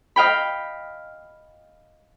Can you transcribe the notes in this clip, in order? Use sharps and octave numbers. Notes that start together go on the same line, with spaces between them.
D#5 F5 G5 B5